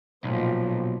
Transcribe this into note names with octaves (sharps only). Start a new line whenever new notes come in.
B1 A#2 F3